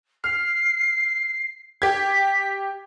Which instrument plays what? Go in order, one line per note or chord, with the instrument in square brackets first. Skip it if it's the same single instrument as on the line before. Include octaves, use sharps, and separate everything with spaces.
[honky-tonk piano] F6 [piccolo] C7
[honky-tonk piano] G4 G#6 [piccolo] B6